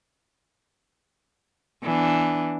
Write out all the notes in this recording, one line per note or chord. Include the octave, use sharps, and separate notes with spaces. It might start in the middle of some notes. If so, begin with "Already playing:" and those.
E3 B3 D4